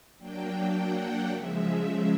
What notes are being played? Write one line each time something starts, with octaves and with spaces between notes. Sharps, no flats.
F#3 A#3 D4 G5
F#5
C#3 F3 G#3 E5